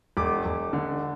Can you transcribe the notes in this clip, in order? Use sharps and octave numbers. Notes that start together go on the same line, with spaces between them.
E1 D6
E1
D3